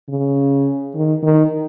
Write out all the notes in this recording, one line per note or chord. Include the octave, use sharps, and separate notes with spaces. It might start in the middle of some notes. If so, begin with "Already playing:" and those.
C#3
D#3
D#3